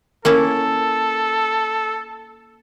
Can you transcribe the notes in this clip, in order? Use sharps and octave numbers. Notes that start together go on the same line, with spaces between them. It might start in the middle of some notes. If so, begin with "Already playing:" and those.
A#3 C#4 E4 A4